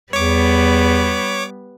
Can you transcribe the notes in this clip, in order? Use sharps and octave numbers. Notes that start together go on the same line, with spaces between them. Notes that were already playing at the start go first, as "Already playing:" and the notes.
E2 G3 B3 C#5 D6